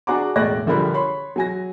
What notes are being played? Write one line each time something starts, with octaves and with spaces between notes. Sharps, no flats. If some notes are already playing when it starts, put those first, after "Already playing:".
D4 F#4 G#4 F#5 A#5 D6
E1 A2 D5 F#6 A#6
A#1 D3 F3 G3 A#4 B5
C#5 B5 C6
F#3 G#5 A#6